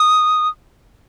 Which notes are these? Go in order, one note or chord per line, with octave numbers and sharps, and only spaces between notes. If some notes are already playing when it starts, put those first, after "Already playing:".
Already playing: D#6